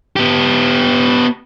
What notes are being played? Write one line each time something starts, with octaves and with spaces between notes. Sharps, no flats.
B3 G4